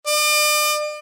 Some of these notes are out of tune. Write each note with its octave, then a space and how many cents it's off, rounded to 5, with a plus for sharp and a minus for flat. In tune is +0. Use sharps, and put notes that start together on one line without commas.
D5 +40